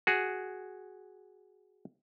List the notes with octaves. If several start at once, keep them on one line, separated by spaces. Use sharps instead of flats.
F#4 G#4